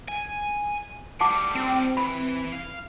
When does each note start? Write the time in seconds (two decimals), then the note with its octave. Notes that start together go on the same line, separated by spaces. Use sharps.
0.09 G#5
1.21 A2 G3 F#5 A5 D6
1.55 C4
1.97 E3 B5
2.52 F5